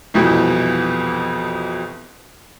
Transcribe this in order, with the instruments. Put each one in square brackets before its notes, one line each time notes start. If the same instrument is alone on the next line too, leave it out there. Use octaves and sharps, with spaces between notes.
[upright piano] C2 F2 B2 E3